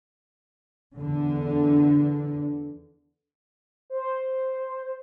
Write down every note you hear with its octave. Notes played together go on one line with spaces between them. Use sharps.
E2 D3
C5